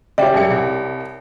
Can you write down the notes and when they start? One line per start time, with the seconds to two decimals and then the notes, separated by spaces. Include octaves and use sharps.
0.18 C#3 G4 C#5 D5 E5 G5
0.34 F#2 G#4 C#7
0.50 C2